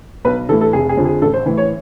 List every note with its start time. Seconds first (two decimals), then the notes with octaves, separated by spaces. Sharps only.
0.25 B1 B4
0.49 A2 E3 A4
0.61 A4
0.73 F1 G#4
0.89 G#4
0.97 F2 D3 F3
1.05 G#4
1.22 A1 A4
1.34 C5
1.46 A2 E3
1.57 C#5